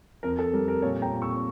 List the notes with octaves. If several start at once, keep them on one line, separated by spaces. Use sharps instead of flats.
F2 A#4
A4
G3 A#4
A#4
A#2 A4 C#5
G5 A#5
A#2
C#6 E6